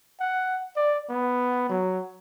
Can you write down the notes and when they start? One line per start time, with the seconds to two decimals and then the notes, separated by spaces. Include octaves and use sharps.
0.20 F#5
0.76 D5
1.09 B3
1.69 F#3